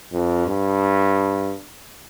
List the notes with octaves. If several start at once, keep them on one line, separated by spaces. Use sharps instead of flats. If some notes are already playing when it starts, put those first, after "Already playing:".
F2
G2